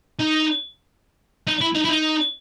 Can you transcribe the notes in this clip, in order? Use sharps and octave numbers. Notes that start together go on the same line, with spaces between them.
D#4
D#4
E4
D#4
E4
D#4